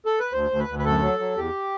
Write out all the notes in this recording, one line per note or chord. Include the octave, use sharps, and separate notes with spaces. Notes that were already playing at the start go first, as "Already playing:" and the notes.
A4
B4
D2 C5
D2
B4
D2
B4
F#2 A4
F#3
F#3
E2 G4